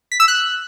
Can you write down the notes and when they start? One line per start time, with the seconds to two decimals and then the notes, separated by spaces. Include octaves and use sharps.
0.12 B6
0.20 E6
0.28 F#6